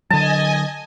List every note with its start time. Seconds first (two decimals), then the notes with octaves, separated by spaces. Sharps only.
0.10 D3 F#3 D#5 G#5 A5